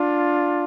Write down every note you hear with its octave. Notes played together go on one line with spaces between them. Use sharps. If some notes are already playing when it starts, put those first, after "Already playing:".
Already playing: D4 F4